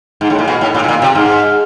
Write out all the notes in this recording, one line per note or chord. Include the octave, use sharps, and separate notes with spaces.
G#2
A2
A#2 F6
B2
A2
A#2
B2
A#2
C3
G#2 F6